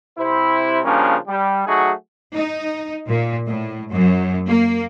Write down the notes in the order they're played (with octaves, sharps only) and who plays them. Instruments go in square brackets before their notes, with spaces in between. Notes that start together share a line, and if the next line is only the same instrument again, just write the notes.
[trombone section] C3 E4 C5
C#3 F3 G3 A#3 C#4 D4
G3
F#3 A3 D#4 F#4 G#4
[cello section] D#4
A#2
A2
F#2
A#3